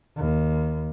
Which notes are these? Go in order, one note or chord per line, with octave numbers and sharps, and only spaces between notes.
D#2